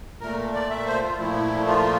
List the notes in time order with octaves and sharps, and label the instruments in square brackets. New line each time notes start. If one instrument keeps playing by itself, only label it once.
[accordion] A#2 A3 A#4
D5
E5
C5
F4
A#2 F3 A3 E4
F4